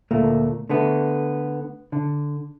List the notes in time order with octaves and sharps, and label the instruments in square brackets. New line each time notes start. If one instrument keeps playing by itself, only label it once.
[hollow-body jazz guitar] D2 A#2 A3 A#3
D3 A3 B3
D3